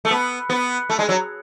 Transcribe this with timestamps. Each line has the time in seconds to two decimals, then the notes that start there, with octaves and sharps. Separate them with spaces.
0.05 A3
0.11 B3
0.50 B3
0.90 A3
0.99 G#3
1.09 F#3